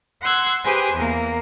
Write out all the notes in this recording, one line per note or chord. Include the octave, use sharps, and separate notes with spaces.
F#5 C6 E6 F#6 G#6
G4 G#4 B4 C5 G#5
E2 A#3